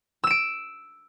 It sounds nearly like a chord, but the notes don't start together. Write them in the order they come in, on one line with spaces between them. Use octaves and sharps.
E6 E7 D7